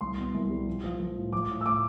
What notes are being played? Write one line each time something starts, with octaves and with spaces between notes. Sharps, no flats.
C2 C6
B2
C2
G3
F3
F3
F3
A2
F3 D6
A2
E6
A2 D6